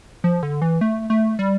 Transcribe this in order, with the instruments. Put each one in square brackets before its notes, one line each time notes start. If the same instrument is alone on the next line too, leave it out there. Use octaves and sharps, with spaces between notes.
[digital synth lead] F3
D3
E3
A3
A3
G3